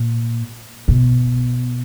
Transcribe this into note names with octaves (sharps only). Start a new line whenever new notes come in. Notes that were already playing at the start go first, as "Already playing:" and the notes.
Already playing: A#2
B2